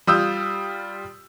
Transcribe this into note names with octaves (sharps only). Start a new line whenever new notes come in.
G3 F4 D#6 E6 G6